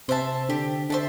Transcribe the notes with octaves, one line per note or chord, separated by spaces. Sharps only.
C3 C5 E5 A5
D3 G4
D3 C5 E5 A5